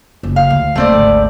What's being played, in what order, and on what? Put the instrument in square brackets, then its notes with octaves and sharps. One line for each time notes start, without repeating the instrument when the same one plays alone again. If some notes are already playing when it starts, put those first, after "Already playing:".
[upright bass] F#1
[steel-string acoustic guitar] F5
[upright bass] D2
[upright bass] D#1 [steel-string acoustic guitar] A3 C4 D5
[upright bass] G#1 D2